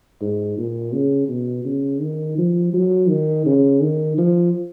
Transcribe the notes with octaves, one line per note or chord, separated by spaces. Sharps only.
G#2
A#2
C#3
B2
C#3
D#3
F3
F#3
D#3
C#3
D#3
F3